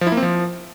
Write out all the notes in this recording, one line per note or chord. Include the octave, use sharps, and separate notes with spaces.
F3
E4
A#3
C4
F3